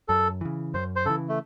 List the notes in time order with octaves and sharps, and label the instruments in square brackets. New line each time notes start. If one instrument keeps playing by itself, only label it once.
[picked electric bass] F#2 [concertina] A4
[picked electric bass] C#3 E3
[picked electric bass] F#2 [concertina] C5
[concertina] C5
[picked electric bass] C#3 E3 [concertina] A4
[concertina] A3